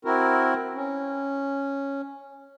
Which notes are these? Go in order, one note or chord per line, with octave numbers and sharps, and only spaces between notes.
C4 E4 F#4 A#4
C#4